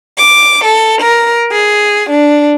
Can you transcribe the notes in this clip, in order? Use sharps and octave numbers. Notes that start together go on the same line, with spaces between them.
D6
A4
A#4
G#4
D4